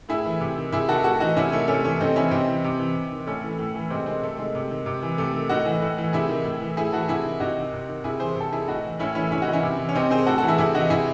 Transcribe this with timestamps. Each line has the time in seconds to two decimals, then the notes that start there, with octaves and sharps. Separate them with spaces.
0.09 A2 E4 G#4
0.26 E3
0.40 C3
0.57 D#3
0.72 C3 E4 G#4
0.89 D#3 F#4 A4
1.04 A2 F#4 A4
1.20 E3 D#4 F#4
1.37 C3 C#4 E4
1.52 D#3 A3 C#4
1.68 C3 A3 C#4
1.84 E3 A3 C#4
2.00 C3 C4 D#4
2.16 E3 C#4 E4
2.31 C3 C4 D#4
2.48 E3
2.64 C3
2.79 E3
2.96 C3
3.12 D#3
3.27 A2 A3 C#4
3.44 E3
3.59 A2
3.75 E3
3.90 C3 G#3 C4
4.06 D#3 G#3 C4
4.23 C3 A3
4.38 D#3 G#3
4.55 C3
4.71 D#3
4.86 C3
5.03 E3
5.18 C3 A3
5.33 D#3
5.49 A2 D#4 F#4
5.65 E3
5.82 A2
5.98 E3
6.13 C3 E4 G#4
6.29 D#3
6.45 A2
6.61 E3
6.77 A2 E4 G#4
6.92 E3 F#4 A4
7.08 C3 E4 G#4
7.25 D#3
7.40 C3 D#4 F#4
7.56 D#3
7.73 C3
7.89 D#3
8.04 C3 E4 G#4
8.20 E3 G#4 C5
8.35 C3
8.41 A4
8.52 D#3 E4 G#4
8.67 A2 D#4 F#4
8.84 E3
8.99 A2 C#4 E4
9.15 E3 C#4 E4
9.31 C3 C#4 E4
9.42 D#4 F#4
9.47 E3
9.53 C#4 E4
9.63 C3
9.79 E3
9.89 C#4
9.95 C3 C4 D#4
10.10 D#3 G#4 C5
10.26 A2 F#4 A4
10.38 F#4 A4
10.43 E3 E4 G#4
10.58 C3 E4 G#4
10.75 E3 D#4 F#4
10.90 C3 E4 G#4